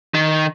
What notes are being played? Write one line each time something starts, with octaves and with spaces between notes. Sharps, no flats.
D#3